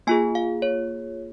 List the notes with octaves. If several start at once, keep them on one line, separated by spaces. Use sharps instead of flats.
A#3 F4 G#4 G#5
F5
C#5